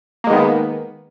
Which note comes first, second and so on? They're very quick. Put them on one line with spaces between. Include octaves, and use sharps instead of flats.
A#3 G#3 D#3 B3